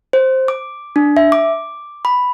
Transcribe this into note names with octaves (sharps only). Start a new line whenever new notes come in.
C5
D6
D4
E5
D6
B5